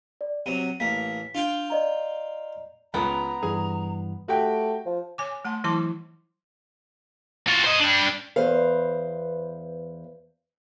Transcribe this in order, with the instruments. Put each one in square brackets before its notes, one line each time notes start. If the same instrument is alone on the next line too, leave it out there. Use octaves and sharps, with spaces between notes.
[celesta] D5
[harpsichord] C3 F#3 [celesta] D#7
[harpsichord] A1 A#3 [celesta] B6
[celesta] D4 [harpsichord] F4 F5 G5
[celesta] D5 D#5 A#5
[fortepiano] C#2 [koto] B3 [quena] A#5
[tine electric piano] G2 E3 G3 [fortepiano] G#4
[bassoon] A3 [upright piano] F#4 G4 G5
[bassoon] F3
[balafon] C#5 G#5 D6
A3 F#5 A5 C6
E3 F#3 E4 A5 C6 D6
[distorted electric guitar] F4 F#4
C5 D#5
G3 D4
[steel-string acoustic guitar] E2 B4 C5 F5